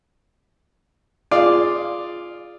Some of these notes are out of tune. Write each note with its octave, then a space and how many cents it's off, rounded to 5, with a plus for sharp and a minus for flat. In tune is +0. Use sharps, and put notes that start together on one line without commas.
F4 -5 G#4 +0 D5 +0